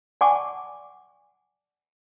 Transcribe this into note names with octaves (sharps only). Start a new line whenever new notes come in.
D5 F#5 G#5 A5 C#6 D6